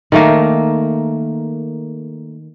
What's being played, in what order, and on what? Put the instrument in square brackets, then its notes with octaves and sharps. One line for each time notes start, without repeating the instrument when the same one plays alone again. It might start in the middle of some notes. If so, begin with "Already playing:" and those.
[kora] D#3 A3 A#3